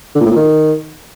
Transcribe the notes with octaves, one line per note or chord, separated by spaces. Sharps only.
D3
A#2
A2
A#2
D#3